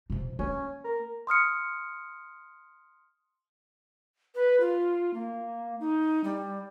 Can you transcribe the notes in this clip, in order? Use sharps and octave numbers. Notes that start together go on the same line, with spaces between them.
C3 F3
A#3 C#4
A#4
C6 D#6 F6 C#7
B4
F4
A#3
D#4
G3